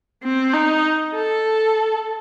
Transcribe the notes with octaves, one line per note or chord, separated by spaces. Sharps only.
C4
D#4
A4